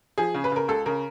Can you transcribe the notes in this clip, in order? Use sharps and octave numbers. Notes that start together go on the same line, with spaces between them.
F3 G#4
C#3
B4
C#3 A#4
C#2 A4
C#3 A#4